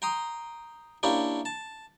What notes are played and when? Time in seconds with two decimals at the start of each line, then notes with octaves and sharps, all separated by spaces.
0.02 G5 A#5 C6 D#6
1.03 A#3 C#4 D4 E4 G4
1.45 A5